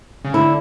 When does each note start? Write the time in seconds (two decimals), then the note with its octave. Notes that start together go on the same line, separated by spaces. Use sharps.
0.24 C#3
0.33 D3 E4